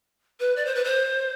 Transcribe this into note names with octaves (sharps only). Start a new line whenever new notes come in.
B4
D5
C5
B4
C5